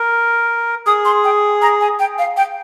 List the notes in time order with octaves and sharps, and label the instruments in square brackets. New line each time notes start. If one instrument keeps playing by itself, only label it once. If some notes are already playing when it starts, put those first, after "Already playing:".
Already playing: [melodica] A#4
[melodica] G#4 [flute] D#6
[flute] C6
G5
A#5
G#5
G5
F5
G5